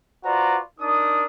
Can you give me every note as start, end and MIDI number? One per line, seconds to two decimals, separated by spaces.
0.24 0.58 65
0.24 0.58 66
0.24 0.58 71
0.24 0.58 72
0.24 0.58 74
0.24 0.58 82
0.80 1.24 62
0.80 1.24 63
0.80 1.24 70
0.80 1.24 87